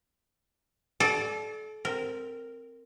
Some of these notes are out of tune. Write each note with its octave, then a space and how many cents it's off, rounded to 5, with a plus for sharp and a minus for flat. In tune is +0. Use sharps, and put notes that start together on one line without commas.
A4 -35 D5 +5
C4 +0 A#4 -10